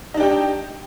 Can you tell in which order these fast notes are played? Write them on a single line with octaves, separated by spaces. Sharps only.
D#4 D4 G4 G5